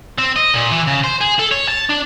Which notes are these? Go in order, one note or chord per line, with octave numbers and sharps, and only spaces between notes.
C4
D#5
A#2
E3
C#3
C5
G#4
A4
C#5
A5
D4